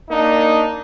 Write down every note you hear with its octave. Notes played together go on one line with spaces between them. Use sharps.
A#3 D4 D#4